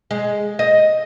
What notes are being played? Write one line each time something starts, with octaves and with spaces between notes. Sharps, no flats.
G#3
D#5